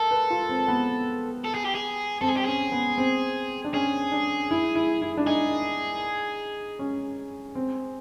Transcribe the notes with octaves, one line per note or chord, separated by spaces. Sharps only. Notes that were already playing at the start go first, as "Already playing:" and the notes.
Already playing: A4 A#4
B4
F4
C4
B3
A4
G#4
G4
G#4
C4 A4
G#4
G4
C#4 G#4
B3
C4
D4
C#4 G#4
D4
E4
E4
E4
D4
D#4 G#4
C#4
C4